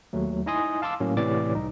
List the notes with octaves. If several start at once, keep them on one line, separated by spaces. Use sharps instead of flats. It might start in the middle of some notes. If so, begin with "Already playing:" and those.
D#2 F#3 A3
D#4 E4 D#5 G#5 C6 D#6
F5 A5 C6 D6 E6
A2 F#3 A#3 C#4
A2 C3 E3 C#5 D5 D6
C2 D#4